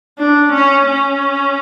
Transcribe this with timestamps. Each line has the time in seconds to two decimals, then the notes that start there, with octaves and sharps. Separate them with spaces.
0.18 D4
0.52 C#4
0.86 C#4